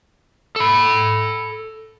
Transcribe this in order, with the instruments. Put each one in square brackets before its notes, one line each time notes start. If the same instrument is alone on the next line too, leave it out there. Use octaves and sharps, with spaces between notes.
[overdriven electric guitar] A4 B5